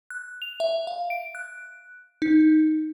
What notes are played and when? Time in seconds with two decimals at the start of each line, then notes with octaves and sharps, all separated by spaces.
0.10 F#6
0.42 F7
0.60 E5
0.87 F5
1.10 D7
1.35 F#6
2.22 D#4